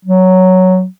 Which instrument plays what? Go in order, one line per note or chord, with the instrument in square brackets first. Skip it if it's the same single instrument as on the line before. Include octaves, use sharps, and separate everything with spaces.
[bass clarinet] F#3